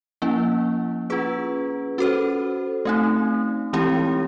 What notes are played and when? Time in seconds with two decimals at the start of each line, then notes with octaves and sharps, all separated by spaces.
0.22 F3 A#3 C#4 E4
1.10 C#4 F4 G#4 B4
1.98 C#4 F#4 A4 C5
2.85 A3 C4 D#4
3.73 E3 G#3 C4 E4 G4